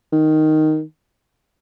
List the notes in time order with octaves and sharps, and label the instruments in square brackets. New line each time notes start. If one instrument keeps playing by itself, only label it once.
[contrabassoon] D#3